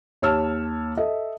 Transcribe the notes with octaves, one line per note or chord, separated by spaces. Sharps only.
D#2 C#5 A5 E6 F6 E7
A4 D#5 E5